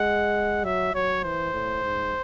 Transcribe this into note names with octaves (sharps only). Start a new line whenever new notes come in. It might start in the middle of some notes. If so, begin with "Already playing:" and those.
Already playing: G#3 F#5
F#3 E5
F#3 C#5
E3 C5
A2
G#2